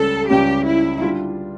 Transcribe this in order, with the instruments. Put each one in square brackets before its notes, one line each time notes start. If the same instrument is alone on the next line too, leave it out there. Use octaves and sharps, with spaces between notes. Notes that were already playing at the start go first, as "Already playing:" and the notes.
Already playing: [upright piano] C#2 C#3 G3 C#4 [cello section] A4
[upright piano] C#2 C#3 G3 C#4 [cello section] G4
[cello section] E4
[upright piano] D3 G3 D4 F4